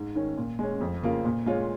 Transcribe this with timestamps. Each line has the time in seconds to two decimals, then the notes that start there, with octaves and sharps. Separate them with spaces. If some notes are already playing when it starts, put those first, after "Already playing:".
Already playing: G#2
0.15 D#3 C#4
0.37 A#2
0.59 G#3 C#4
0.80 F2
1.02 C#3 A#3 F4
1.25 A#2
1.46 G#3 F4 C#5